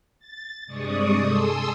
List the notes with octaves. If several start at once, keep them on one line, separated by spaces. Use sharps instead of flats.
A6
G2 C3 G#3 D5 C#6 D#6
G#4 A4 C6 D#6 E6